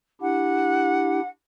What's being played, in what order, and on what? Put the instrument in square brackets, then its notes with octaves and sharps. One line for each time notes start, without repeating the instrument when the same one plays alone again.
[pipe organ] D4 E4 G4 [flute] F#5